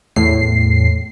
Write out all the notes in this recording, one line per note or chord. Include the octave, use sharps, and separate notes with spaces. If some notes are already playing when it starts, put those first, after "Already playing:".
E2 A2 C7